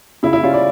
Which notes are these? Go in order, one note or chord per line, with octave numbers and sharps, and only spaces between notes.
C#3 E4
E4
G3 C#4 F4
D5